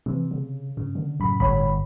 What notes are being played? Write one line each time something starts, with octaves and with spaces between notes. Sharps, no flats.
C3 E3
C#3
G2 C#3
D3
F#2 A2 C#3 B5
G1 C#5 B5